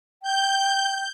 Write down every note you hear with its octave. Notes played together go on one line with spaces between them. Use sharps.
G5 G6